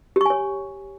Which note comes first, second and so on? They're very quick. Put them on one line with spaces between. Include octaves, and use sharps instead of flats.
G4 C#6 G#5 C#5